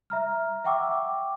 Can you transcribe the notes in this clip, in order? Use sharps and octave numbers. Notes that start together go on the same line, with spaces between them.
E5 A#5 F6
E5 F#5 G5 C#6 D6 E6